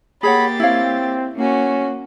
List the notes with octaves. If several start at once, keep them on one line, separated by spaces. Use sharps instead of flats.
A#3 G4 G#4 C#5 F#5 B5 A6
C4 E4 C#5 F5
A#3 C#4 F#4